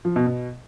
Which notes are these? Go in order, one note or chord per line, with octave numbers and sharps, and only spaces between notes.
F3
B2
B2